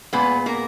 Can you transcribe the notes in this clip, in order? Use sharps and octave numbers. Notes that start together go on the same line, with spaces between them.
A#2 G#3 B3 B4
A#3 A#4